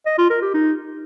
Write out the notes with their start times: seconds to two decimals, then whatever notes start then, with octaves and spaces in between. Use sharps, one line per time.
0.06 D#5
0.18 F4
0.30 A#4
0.42 G4
0.54 D#4